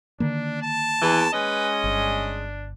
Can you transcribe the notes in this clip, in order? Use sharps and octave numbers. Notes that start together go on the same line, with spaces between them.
D3 D#3 A#3 D4
A5
E2 E3
G#3 C#4 B4 D#5
G1 D4